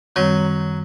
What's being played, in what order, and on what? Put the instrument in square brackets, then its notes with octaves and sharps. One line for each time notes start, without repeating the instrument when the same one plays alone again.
[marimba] F#2 D#3 G3 C4 [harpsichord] F#3